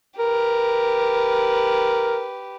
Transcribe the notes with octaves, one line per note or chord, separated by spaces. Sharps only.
G4 A#4 B4